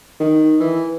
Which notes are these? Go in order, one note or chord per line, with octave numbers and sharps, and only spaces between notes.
D#3
E3